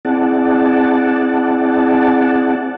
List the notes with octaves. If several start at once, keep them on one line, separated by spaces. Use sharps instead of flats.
C4 E4 G#4 D5 F#5 A5